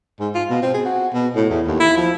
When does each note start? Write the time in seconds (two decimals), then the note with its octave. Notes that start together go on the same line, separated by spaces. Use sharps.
0.20 G#2
0.35 F4
0.50 B2
0.62 C4
0.74 G#4
0.86 F#4
1.14 B2
1.36 A2
1.50 E2
1.67 D#2
1.80 E4
1.97 F3